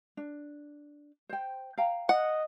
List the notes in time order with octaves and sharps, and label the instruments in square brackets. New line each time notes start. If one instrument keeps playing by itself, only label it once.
[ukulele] D4
C5 G5
F5 G5 A#5
[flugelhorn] D#5 [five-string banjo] F#5